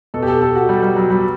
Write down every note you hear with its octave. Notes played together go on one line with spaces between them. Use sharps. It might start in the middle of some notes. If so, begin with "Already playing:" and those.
B2 A4
G4
A4
A4
F#4
G3
G3
F#3
G3